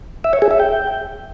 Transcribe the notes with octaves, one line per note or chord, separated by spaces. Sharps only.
E5
C#5
G#4
E5
G5